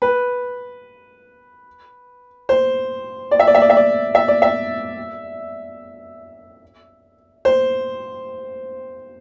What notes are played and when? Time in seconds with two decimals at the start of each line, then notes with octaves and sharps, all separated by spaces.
0.02 B4
2.49 C5
3.31 D5
3.40 E5
3.47 D5
3.55 E5
3.62 D5
3.70 E5
3.77 D5
4.15 E5
4.28 D5
4.42 E5
7.45 C5